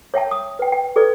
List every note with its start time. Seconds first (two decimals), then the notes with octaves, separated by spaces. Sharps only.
0.14 C#5 E5 G5 A5
0.31 D#6
0.59 B4 G5
0.72 G5
0.96 G#4 A4 B4 D5